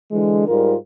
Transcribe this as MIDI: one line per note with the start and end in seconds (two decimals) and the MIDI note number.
0.11 0.45 50
0.11 0.45 52
0.11 0.45 56
0.47 0.75 44
0.47 0.75 55
0.47 0.75 65
0.47 0.75 70